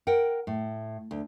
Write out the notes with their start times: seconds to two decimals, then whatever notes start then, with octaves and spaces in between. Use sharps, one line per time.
0.07 A#4 F#5 G5
0.47 A2
1.11 D2